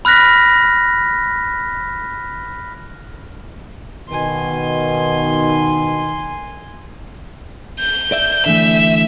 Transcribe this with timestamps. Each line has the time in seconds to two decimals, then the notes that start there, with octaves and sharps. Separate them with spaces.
0.05 B5 F6 F#6 A#6 B6
4.09 B2 D#3 G#5 C6
7.79 G6
8.12 D5 E5
8.46 D3 E3 A3 E5